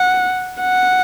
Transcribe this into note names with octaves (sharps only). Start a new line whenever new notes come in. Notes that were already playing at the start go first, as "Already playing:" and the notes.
Already playing: F#5
F#5